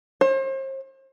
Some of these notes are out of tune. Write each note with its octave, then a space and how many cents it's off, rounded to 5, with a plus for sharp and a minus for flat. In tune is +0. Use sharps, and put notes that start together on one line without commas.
C5 +40